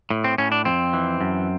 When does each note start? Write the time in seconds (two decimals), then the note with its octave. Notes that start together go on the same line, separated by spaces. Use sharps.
0.10 A2
0.24 C4
0.38 A2 C#4
0.52 D4
0.65 F2 C4
0.93 E3
1.21 F#2